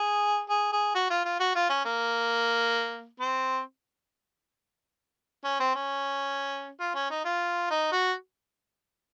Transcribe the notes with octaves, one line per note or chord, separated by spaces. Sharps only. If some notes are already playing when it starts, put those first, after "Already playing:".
Already playing: G#4
G#4
G#4
F#4
F4
F4
F#4
F4
C#4
A#3
C4
C#4
C4
C#4
F4
C#4
D#4
F4
D#4
F#4